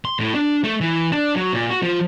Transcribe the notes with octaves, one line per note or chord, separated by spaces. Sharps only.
C6
A2
D4
A3
E3
D4
F#3
A#2
F#4
F3